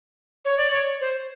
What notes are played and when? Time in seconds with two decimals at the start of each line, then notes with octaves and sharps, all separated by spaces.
0.45 C#5
0.57 D5
0.70 C#5
1.01 C5